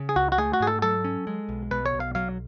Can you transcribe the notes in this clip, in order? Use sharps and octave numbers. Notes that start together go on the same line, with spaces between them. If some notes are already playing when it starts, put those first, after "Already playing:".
Already playing: C#3
G#4
C#2 F#4
F#4
A3 G#4
F#4
G#2 G#4
A4
F#3 A4
C#4
G#3
B1
B2 B4
C#5
B1
F5
F#3 F5